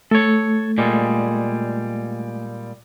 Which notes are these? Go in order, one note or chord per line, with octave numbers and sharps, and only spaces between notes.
A3 A4 C#5
A#2 G3 G#3